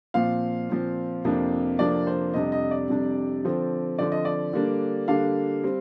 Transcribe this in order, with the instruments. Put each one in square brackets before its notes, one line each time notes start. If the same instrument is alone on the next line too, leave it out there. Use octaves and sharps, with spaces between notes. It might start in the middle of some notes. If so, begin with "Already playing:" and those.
[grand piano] A#2 F3 C4 F5
A#2 F3 C4
F2 C3 F3 A#3 D4
F2 C3 F3 A#3 D4 D5
C5
F2 C3 G3 D4 D#5
D#5
D5
F2 C3 G3 D4
D3 F3 C4
D3 F3 C4 D5
D#5
D5
D3 G3 A#3 D4
D3 G3 A#3 D4 F5
G3 C4